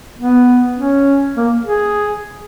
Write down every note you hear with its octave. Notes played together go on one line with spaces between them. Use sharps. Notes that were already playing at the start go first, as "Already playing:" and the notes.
B3
C#4
A#3
G#4